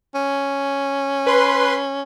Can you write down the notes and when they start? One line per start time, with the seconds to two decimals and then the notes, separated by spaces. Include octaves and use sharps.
0.15 C#4
1.27 B4 C6